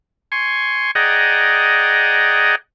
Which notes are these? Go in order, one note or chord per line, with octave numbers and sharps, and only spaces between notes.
G#5 C6 C#6
G#4 D5 D#5 F#5 G5 A#5